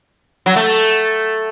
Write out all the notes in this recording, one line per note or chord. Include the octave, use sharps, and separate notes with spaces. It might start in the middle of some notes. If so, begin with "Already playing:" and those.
F#3
A3